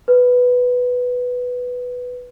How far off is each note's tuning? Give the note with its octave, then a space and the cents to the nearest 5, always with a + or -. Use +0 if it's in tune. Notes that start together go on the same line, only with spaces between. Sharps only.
B4 +0